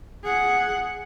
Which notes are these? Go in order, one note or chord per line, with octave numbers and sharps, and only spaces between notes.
G#4 F#5